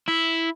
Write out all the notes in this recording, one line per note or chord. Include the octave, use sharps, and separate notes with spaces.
E4